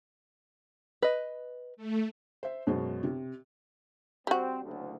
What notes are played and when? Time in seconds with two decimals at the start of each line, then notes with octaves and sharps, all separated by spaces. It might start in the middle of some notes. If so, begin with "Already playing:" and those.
1.02 B4 D#5
1.77 A3
2.43 C5 E5
2.67 F#2 B2 G#3 F#4 C5
3.03 C3
4.27 G3 C4 F#4
4.63 F#1 D2 D3